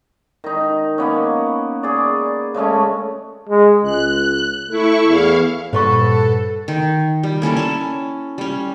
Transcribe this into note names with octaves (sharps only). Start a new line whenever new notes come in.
D#3 D#4
A#3 B3 C#4
G#4 D5
C#3 G#3 A3 C#4
G#3
C#2 F#6
A3 E4 C#6
E2 F5
G2 A#2 A4 B4 C5 D5 F#5 C#6
D#3
G3
A#3 C#4 E4 A4
C#4 A5
G3 C#4